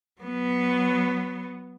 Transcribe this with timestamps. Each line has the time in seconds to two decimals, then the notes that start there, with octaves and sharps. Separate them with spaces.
0.21 F#3 B3